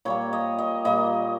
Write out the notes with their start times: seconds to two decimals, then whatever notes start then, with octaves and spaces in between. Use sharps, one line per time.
0.05 A#2 G3 A#3 C#5
0.33 D#5
0.59 D#5
0.85 A#2 G3 A#3 D#5